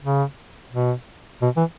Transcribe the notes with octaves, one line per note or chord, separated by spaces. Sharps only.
C#3
B2
B2
E3